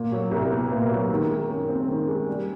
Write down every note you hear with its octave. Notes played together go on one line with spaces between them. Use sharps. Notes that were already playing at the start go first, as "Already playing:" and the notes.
Already playing: A#2
F#3
C2
B3
A#2
F#3
D#3
G#3
F#2
C4
D#3
G#3
G3